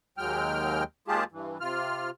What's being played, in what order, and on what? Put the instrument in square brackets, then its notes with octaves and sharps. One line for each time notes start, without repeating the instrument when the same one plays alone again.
[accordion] D#2 F#3 G#3 G5 F6
D#2 G#3 F4 G4 G#4 A5
G2 E3
C3 F4 F6